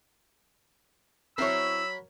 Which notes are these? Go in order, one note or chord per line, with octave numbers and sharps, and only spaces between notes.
F#3 C4 E4 A#4 C#5 B5 E6